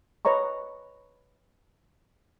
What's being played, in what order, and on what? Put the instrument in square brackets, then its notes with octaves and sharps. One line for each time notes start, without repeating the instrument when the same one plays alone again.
[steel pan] B4 C#5 D#5 A#5 C#6